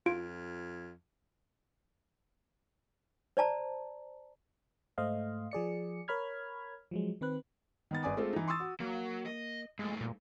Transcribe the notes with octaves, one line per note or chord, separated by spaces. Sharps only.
F2 F4 D7
C5 D5 A5 A#5
G#2 A3 C5 D#5 F5
F3 G#4 D5 C#7
A#4 C#5 B5 F6 G#6
F3 F#3 G#3
D#3 C4 B4 F#6
D#3 B3 A6
G#1 B4 D5 G#5 D6 D#6
G#3 A3 C4 F4 A4
E3 D#4
C6 C#6 D#6 E6 A6
F#4
F#3 A#3
D#5
G2 G#3 A3
A#2